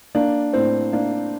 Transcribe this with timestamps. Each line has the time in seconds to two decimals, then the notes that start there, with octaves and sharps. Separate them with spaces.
0.15 A#3 D4
0.53 A2 C4
0.93 A#3 D4